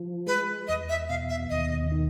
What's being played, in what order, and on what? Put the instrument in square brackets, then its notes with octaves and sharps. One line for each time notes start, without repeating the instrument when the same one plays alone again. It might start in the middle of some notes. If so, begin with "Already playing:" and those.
Already playing: [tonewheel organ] F3
[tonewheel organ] G#3 [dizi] B4
[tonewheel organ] E2 [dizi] D#5
[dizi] E5
[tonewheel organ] B2 [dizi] F5
[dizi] E5
[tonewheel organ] D#2 [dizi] D#5
[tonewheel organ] D#3